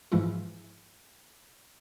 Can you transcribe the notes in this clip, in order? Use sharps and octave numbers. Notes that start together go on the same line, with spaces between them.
G#2 E3 F3 G#3 E4 F4